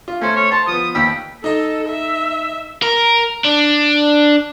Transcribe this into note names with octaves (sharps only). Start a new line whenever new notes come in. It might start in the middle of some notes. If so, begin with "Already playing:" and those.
F4
A3 C#4 C5
C#5
C5 A5
F3 B3 D#6
D#2 G5 B5 E6
D#4 A4 D#5
E5
A#4
D4